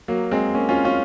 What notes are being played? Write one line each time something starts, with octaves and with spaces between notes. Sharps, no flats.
F#3 A#3
G#3 C4
A#3 C#4
C#4 F4
C#4 F4